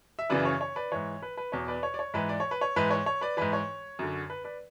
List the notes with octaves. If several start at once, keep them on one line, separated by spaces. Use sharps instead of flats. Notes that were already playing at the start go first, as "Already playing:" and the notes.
E5
F#2 C#3 E3 B4 D5
C#5
C#5
B4 D5
G#2 E3 C#5
B4
B4
E2 B2 C#5
B4 D5
C#5
D5
C#5
G#2 E3 B4
D5
C#5
B4
C#5
G#2 E3 B4
C#5
C#5
B4 D5
G#2 E3 B4
C#5
F#2 D3
B4
B4 D5